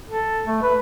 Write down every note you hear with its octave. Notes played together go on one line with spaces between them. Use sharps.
A4
A3
B4